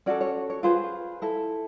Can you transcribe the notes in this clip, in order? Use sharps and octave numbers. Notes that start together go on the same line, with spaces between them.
C#4 F#4 A4 D5
C#5
C#5
F4 G#4 B4 C5
E4 A4